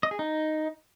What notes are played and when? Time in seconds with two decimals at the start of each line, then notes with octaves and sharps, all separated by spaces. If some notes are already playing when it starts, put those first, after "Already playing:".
0.03 D#5
0.11 G#4
0.19 D#4